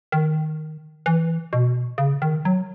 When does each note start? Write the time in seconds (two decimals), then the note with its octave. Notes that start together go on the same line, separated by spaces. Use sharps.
0.12 D#3
1.06 E3
1.53 B2
1.98 C#3
2.22 D#3
2.45 F#3